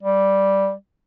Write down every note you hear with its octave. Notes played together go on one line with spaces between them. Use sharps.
G3